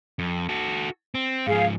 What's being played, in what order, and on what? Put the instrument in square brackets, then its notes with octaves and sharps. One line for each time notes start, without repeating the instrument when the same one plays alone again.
[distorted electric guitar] F2
F#4 A4
C4
[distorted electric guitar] G#2 F3 [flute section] G#4 F5